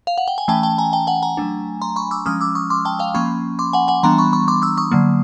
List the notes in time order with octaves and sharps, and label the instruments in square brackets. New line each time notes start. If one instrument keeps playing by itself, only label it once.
[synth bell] F5
F#5
G5
G#5
E3 A3 C#4 G5 A5
G5 A5
G#5 A#5
G5 A5
F#5 G#5
G#5 A#5
F#3 A3 D4
A#5 C6
B5 C#6
D6 E6
F3 G#3 C#4 D#6 F6
D6 E6
C#6 D#6
C6 D6
G5 A5
F5 G5
F3 A#3 C#4 B5 C#6
C6 D6
F#5 G#5
F#5 G#5
E3 G3 B3 D4 A#5 C6
B5 C#6
B5 C#6
C6 D6
D6 E6
C#6 D#6
D3 F#3 A#3